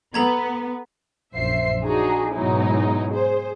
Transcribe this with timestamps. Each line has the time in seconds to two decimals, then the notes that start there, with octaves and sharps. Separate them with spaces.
0.14 B3 A4 A#5 G#6
1.34 A#1 F#2 C5 E5 C7
1.84 D4 D#4 F#4 G#4 A#5
2.33 G#2 B2 F#3 G#3 D#4 E4
3.10 G#4 C5